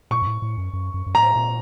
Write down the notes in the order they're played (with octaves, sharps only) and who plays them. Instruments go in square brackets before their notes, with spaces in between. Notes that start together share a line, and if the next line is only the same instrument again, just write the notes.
[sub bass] A#2 [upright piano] C#6
[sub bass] F#2
A2
A2
F#2
F#2
F#2
F#2
[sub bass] A2 [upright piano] A#5
[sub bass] A#2